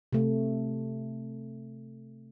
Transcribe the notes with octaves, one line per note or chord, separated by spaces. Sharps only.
C3 A3